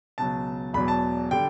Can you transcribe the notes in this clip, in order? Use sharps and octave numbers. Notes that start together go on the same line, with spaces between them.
C#2 B2 F#3 A5
E1 E2 B2 F#3 B5
A5
D3 G3 G5